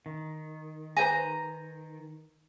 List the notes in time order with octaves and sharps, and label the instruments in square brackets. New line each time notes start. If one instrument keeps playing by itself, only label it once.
[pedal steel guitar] D#3
[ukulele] B4 C5 G#5 [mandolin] A#5